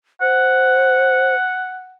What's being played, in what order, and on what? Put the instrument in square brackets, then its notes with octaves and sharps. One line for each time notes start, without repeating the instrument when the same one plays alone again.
[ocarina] C5 [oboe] F#5